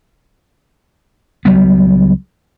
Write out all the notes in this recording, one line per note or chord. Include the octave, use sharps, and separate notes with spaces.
C#2 F#3 G3 B3